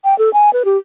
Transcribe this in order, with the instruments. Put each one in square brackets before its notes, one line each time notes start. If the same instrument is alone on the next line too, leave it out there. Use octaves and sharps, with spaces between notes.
[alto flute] G5
A4
G#5
B4
G4